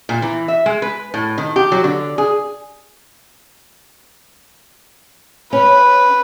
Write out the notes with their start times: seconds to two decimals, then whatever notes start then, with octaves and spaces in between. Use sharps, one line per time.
0.09 A#2
0.22 E3
0.48 E5
0.66 G#3
0.82 B4
1.14 A2
1.38 D#3
1.56 G4
1.72 F#3
1.84 D3
2.18 G#4
5.53 C#4 B4